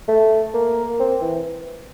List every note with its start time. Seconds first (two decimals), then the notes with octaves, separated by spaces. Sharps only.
0.08 A3
0.54 A#3
0.99 C4
1.21 E3